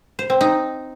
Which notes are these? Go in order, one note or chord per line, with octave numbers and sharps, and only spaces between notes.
C5
C4
D#4